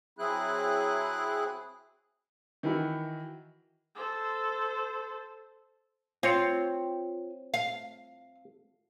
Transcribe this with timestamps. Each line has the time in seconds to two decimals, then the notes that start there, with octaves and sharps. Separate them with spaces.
0.19 F#3 C4 E4 G#4 F#6
2.63 D#3 E3 E4 F#4
3.95 A4 C5
6.23 C4 F4 C#5
7.54 F5